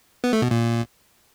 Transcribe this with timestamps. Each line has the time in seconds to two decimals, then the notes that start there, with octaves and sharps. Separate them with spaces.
0.24 B3
0.33 A3
0.42 B2
0.51 A#2